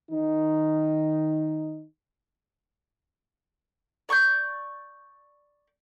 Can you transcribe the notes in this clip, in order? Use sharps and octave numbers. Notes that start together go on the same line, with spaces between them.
D#3 D#4
D5 C#6 D6 G6